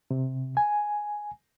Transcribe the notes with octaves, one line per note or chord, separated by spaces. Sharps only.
C3
G#5